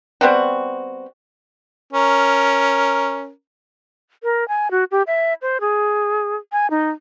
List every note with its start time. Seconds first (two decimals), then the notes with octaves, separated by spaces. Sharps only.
0.21 G3 B3 C4 F#4
1.93 C#4 A#4
4.23 A#4
4.48 G#5
4.71 F#4
4.91 G4
5.07 E5
5.42 C5
5.61 G#4
6.52 G#5
6.70 D#4